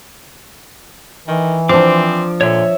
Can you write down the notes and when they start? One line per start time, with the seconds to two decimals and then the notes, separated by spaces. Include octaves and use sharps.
1.28 D#3 E3
1.69 F3 C4 D4 D6
2.41 A#2 D3 C#5 E5